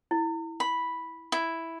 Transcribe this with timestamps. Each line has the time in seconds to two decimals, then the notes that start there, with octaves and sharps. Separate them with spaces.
0.11 E4
0.60 B5
1.32 E4